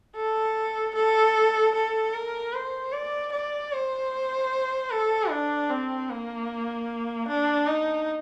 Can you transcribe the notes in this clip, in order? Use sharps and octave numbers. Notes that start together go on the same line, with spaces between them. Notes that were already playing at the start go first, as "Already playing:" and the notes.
A4
A4
A4
A#4
C5
D5
D5
C5
A4
D4
C4
A#3
D4
D#4